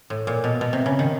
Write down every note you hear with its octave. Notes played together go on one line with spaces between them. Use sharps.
A2
A#2
B2
B2
C3
C#3
D#3